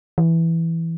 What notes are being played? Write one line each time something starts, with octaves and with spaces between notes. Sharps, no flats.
E3